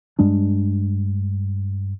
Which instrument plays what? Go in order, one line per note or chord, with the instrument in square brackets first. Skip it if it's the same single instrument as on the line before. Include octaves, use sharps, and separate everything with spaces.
[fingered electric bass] G2 G3 G#3 D4